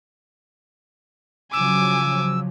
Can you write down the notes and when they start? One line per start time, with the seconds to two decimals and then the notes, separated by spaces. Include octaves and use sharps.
1.53 C#3 F3 F#3 G#5 D6 E6